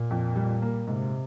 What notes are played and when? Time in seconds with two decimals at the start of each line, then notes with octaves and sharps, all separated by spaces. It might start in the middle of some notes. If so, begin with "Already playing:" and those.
Already playing: A#2
0.11 F2
0.36 G3
0.62 A#3
0.87 G#2 C3